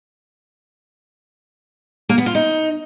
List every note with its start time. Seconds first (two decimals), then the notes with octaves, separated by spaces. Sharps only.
2.09 A#3
2.18 B3
2.26 F4
2.35 D#4